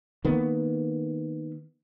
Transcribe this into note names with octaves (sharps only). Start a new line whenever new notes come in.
D#3 A#3 B3